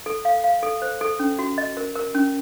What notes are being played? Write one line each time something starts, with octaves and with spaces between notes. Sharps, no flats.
A4
F5
F5
A4
C5
A4
C#4
F#4
D#5
A#4
A#4
C#4